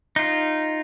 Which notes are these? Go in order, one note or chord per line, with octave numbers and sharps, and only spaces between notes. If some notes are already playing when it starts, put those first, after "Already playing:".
D#4 F4